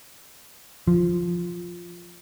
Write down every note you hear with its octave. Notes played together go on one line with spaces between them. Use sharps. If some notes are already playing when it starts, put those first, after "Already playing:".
F3